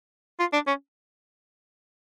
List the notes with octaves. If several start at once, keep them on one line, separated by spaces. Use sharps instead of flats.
F4
D4
C#4